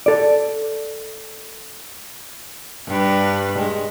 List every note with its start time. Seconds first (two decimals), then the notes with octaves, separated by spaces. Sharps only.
0.06 A4 D5
2.88 G2 B4
3.59 G#3